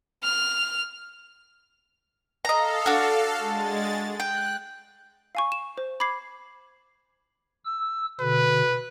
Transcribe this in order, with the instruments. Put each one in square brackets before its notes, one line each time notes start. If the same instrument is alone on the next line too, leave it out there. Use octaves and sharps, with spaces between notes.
[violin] F6
[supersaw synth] A4 F5 [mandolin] D#5 A#5
[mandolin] D4 F#4
[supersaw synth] G#3 A6
[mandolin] G5 [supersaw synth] F#6
[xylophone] F5 G#5 C#6
E7
C5
B5 D6 G#6 C7
[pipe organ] E6
[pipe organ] B2 D3 [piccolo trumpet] B4